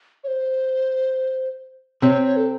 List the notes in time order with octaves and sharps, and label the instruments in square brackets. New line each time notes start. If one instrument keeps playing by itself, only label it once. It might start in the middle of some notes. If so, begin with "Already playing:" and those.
[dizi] C#5
C5
[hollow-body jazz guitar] C3 C4 [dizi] C#5
[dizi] C#5
A4